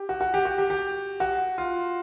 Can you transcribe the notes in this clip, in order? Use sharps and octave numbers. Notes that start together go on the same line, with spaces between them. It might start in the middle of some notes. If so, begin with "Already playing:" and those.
Already playing: G4
F#4
F#4
G4
F#4
G4
G4
F#4
F4